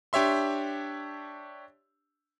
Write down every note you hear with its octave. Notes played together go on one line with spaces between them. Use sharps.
D4 G4 C#5 E5 C6